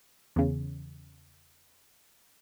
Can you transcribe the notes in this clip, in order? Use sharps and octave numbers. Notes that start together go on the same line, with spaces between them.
E2 C#3